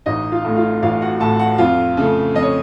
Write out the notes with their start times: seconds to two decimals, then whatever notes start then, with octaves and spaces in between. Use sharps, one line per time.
0.06 A1 D#4 D#5
0.32 F4 F5
0.45 A2 A3
0.56 F4 F5
0.83 A1 F4 F5
1.01 F#4 F#5
1.20 A2 A3 A4 A5
1.39 F#4 F#5
1.58 F2 F4 F5
1.97 C#3 A3
2.35 F2 D#5
2.42 C#5